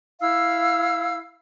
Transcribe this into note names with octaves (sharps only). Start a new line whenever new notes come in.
E4 F5 E6